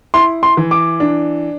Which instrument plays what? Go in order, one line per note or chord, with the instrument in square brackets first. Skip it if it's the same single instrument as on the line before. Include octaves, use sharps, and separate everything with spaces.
[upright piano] E4 [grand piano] C6
[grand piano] C6
[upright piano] E3
[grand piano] D6
[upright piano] D4